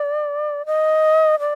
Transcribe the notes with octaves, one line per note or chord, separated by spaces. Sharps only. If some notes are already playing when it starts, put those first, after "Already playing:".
Already playing: D5
D#5
D5